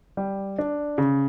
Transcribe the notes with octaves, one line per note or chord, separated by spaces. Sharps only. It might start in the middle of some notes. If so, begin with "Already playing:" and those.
G3
D4
C#3